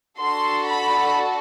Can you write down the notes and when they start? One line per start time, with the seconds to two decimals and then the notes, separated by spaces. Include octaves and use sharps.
0.20 D4 F#4 A4 C6
0.68 B5